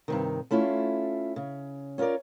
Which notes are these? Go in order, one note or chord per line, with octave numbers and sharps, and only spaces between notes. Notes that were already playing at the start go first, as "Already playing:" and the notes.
G2 C3 D#3
A3 C#4 E4 F4
C#3
C#4 F4 A4 A#4 D5